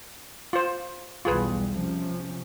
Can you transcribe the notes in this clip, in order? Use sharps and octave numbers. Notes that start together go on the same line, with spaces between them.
F4 C5
B1 E2 G3 F4 G#4 B4
C3 F3 C#4